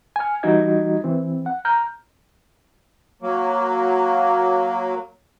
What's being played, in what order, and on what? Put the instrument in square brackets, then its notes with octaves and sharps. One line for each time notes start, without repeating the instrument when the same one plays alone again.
[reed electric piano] G#5 F6
E3 G3 D#4 F#4 D#5 G#6
E3 C4
F#5
A#5 F6 G6
[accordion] F#3 A#3